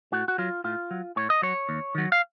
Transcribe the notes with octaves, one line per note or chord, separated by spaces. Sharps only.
A2 F#4
F#4
F#3 F4
A2 F4
F#3
A2 C#5
D#5
F#3 C#5
D#2
D#3 F#3
F5